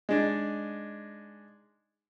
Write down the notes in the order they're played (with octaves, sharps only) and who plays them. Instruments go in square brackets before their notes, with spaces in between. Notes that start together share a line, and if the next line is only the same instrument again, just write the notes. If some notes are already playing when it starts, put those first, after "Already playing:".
[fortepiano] G#3 D4 D#4